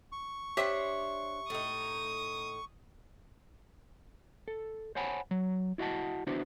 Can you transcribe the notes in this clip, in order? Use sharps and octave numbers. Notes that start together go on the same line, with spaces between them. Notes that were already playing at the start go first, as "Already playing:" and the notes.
C#6
D4 G4 C5 C#5 E5
A2 D#4 D#6
A4
C5 C#5 F#5 G#5 A5 B5
F#3
E4 F#4 D#5 F#5 A5
B3 D4 E4 F#4 C5